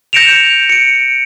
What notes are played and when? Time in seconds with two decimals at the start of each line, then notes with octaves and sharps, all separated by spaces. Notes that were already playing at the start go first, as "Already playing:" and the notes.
0.13 G6 A#6 C#7 D7 E7 F7
0.69 C#7 D7